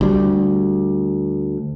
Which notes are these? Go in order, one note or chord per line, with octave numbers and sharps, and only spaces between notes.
D2 G3